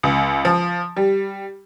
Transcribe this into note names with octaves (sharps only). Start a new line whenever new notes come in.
C#2
F3
G3